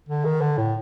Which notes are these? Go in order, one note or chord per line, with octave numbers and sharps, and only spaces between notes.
D3
D#3
D3
A2